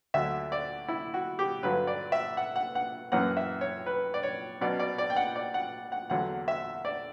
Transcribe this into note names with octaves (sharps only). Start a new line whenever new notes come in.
D2 D3 F#3 E5
D5
E4
F#4
G4
G2 D3 F#3 B4
D5
E5
F#5
F#5
F#5
F#2 E3 A#3 C#4 F#5
E5
C#5
B4
D5
C#5
B2 F#3 C#4 D5
D5
D5
G5
F#5
D5
F#5
F#5
E2 D3 F#3 F#5
E5
D5